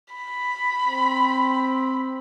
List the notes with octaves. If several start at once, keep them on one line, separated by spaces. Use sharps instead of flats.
B5
C4